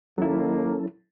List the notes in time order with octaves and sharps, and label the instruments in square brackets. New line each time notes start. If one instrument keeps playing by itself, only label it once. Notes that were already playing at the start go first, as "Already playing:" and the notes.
[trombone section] D#2 D#3 A#3 [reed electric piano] F#3 E4 [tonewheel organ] C#4 A4